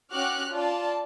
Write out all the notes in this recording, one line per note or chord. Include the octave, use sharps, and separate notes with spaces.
C#4 F#4 G5 D6 F6 F#6
F4 D5 A5